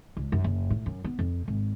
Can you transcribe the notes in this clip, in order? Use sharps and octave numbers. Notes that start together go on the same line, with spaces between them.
C#2
F#2
F#1
A2
F#2
B3
F2
G#1